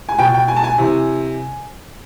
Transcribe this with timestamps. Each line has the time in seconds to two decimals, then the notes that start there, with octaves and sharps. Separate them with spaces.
0.09 G#5
0.19 B2 G5
0.34 G5
0.48 G#5
0.56 A5
0.64 G#5
0.78 C3 E3